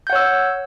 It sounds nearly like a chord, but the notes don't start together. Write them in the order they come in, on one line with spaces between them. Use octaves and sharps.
G6 F#5 C#5 E6